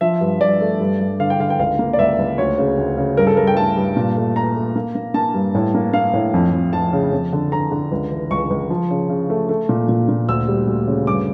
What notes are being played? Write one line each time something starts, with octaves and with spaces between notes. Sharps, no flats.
F3 E5
G2
G2 D5
A3
G2
G2
D3 F5
G5
D3 F5
G5
C#2 F5
A#3
D5
C#2 E5
C#2
D2 C#5
C#3
D2
C#3
G2 A#4
A4
G2 A#4
G5
A3 A5
G2
A#2
A3
A3 A#5
A3
A#3
A#3
A#3 A5
G2
A2
A#3
A#3 F5
A2
F2
F2
F2 A5
C#3
F2
D3
D3 A#5
D3
C#2
E3
C#2 C#6
C#2
F3
C#3
C#3
A3
A3
A#2
A#2
A#2
D2 E6
G3
D2
C#3
G2 D6